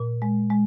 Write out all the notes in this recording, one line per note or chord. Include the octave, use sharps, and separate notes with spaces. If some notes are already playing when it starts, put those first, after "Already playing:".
Already playing: A#2
G#3
G#3